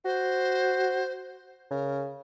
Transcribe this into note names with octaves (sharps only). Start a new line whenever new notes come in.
F#4 C5
C#3 A#4